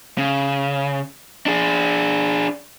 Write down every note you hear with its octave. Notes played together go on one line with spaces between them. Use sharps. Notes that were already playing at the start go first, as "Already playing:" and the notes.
C#3
D4 G#4